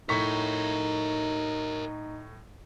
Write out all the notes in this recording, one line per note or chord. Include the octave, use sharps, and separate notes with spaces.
A2 D#4 A#4 C#5 C#6 B6